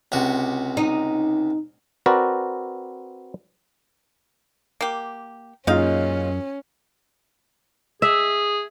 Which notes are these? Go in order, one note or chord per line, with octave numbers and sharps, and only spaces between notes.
C#2 C3 F#4
D#4
C4 F#4 A#4 B4 D5
A#3 G4
F#2 A#2 G#3 C#4 D#4 F4 F5
G#4 E5